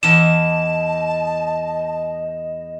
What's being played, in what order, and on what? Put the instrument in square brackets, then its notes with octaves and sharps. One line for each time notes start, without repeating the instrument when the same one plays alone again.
[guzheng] E2 E3 [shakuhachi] D#5 [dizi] A5 [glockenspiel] E7